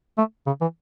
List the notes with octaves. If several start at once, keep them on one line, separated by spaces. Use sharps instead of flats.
A3
C#3
E3